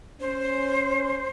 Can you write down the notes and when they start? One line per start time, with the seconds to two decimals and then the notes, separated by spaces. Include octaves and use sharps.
0.21 C#4 C5